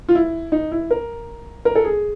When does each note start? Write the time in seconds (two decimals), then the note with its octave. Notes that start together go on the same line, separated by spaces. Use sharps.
0.09 F4
0.15 E4
0.52 D#4
0.72 E4
0.91 A#4
1.65 A#4
1.75 A4
1.85 G#4